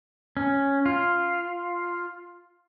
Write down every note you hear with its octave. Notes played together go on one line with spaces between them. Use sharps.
C#4
F4